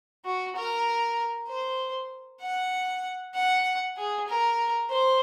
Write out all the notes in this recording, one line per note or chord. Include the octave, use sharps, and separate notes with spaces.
F#4
A#4
C5
F#5
F#5
G#4
A#4
C5